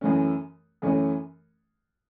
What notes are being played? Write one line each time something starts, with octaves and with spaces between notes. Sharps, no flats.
F#2 E3 A3 C#4
F#2 E3 A3 C#4